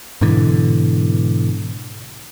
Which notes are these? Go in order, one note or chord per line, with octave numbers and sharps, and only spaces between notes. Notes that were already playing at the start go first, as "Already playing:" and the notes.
G#2 B2 D3 E3